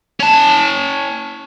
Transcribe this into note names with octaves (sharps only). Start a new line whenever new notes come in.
C#4 A5